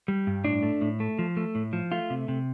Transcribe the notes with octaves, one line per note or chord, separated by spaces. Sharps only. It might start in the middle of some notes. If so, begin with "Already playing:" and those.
G3
G2
A2 D4
A3
A2
A3
F3
A3
A2
F3
A3 F4
C3
C3